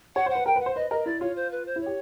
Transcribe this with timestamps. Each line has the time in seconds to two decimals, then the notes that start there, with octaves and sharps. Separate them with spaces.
0.16 C#5 F#5
0.26 C5 F#5
0.35 B4
0.46 A#4 G5
0.56 B4
0.61 F#5
0.66 C5
0.75 B4 D#5
0.90 A#4 D#5
1.06 E4 D5
1.21 F4 C#5
1.36 C5
1.51 B4
1.66 C5
1.76 E4
1.81 C#5
1.86 G4